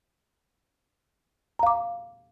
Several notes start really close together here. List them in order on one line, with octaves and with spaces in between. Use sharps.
A#5 F5 D6